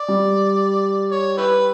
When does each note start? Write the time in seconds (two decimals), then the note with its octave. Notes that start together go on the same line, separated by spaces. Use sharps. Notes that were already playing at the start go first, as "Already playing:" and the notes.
Already playing: D5
0.08 G3
1.11 C#5
1.38 E4 G4 B4